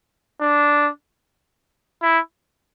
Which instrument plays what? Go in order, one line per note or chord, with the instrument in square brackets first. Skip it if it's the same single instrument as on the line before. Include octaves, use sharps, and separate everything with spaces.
[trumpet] D4
E4